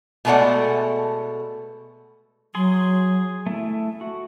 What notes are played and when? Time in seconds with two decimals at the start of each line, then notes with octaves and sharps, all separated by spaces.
0.25 B2 G#3 A3 A4 D5 F#5
2.55 F#3 G#4 C6
3.46 A3 E4 E5
4.01 F#4